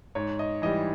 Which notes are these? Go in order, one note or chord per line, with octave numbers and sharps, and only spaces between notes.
G#2 C#5
D#5
E3 G3 D#5